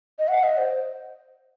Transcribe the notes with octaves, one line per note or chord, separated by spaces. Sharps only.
D#5
F#5
D#5
C5